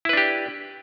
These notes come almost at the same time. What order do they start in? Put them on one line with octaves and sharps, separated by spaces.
E4 B4 D4 G4